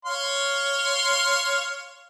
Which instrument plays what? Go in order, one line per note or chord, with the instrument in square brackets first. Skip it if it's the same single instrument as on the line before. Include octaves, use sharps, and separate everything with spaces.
[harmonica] C#5 F5 C6